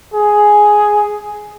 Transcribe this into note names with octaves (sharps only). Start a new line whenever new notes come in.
G#4